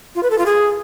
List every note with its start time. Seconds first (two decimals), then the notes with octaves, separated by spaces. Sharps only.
0.15 F4
0.23 B4
0.31 A4
0.38 F4
0.46 G#4